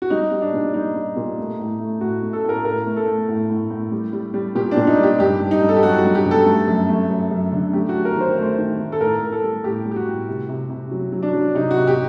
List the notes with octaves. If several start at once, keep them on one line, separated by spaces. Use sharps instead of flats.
F#4
G3 D#4
G3
D4
A#2
G3 D#4
G3
A#2
A3
A2
A3
A2 F#4
A3
A4
A2
A#4
A2 A#4
A3
A4
A3
A2
A2
A2
G3
G3
G3
A#2 G4
D4
A#2
D#4
G3 G4
G2 G4
G2
D#4
G2
A4
G4
F#3 F#4
F#4
G2
G4
G2
A4
A3
F#2
A3
F#2
F#2
D3
A3 G4
F#4
F#3
A#4
D#3 C5
A3
C5
D#3
A3
A4
A2 A#4
A2
A4
G3
A2 G4
G3
G4
F#4
A2
C3
C3
C3
F#3
F#3
D4
F#3
C3 D#4
F#4
C3
G4